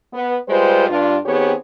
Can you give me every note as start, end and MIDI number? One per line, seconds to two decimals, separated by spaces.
0.13 0.35 59
0.49 0.87 55
0.49 0.87 56
0.49 0.87 65
0.49 0.87 71
0.49 0.87 72
0.88 1.17 43
0.88 1.17 62
0.88 1.17 65
1.26 1.53 51
1.26 1.53 59
1.26 1.53 60
1.26 1.53 67
1.26 1.53 68
1.26 1.53 73